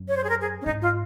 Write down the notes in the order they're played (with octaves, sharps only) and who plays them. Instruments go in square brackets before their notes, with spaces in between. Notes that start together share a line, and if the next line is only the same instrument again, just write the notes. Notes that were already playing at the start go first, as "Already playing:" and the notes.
Already playing: [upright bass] F#2
[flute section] C#5
C5
G#4
A#4
G#4
C#4
[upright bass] G#2 [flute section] D#4
[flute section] F4